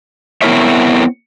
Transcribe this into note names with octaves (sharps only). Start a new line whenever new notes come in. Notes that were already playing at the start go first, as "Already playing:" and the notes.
B3 C4 E4 A#4 C#5 E5